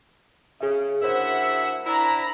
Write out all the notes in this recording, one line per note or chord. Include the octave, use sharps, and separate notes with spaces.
C#3 G#4 E5
D2 E4 A#4 C5 E5 F#5
D4 E4 A#5 B5